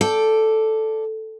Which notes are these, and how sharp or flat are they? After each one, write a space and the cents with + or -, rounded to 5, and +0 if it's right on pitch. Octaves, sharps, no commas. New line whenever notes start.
A4 +0 D5 +0 G5 +0